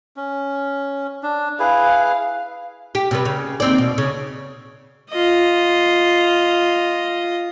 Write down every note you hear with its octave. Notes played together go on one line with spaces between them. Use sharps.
C#4
D4
E4 G#4 B4 F5
G4
C3 G3 B4
C#3
D#2 C4 D5
B2
C#3
F4 D#5